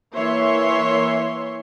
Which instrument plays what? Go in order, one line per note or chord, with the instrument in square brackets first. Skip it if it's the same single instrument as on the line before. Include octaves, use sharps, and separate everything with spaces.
[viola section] E3 A#3 C#5 E5 C6